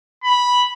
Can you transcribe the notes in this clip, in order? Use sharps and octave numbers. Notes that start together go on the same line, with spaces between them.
B5